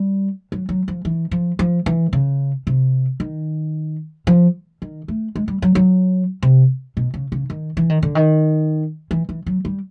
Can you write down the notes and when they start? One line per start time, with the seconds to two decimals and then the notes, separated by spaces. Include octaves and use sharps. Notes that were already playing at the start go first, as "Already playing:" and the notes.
Already playing: G3
0.52 F#3
0.69 F#3
0.88 F3
1.05 E3
1.31 F3
1.59 F3
1.86 E3
2.13 C#3
2.67 C3
3.20 D#3
4.27 F3
4.82 D#3
5.08 A3
5.36 G#3
5.48 G3
5.62 F#3
5.75 F#3
6.43 C3
6.97 B2
7.14 C#3
7.32 C#3
7.50 D#3
7.77 E3
7.90 D#3
8.03 D3
8.15 D#3
9.11 E3
9.29 E3
9.46 F#3
9.65 G3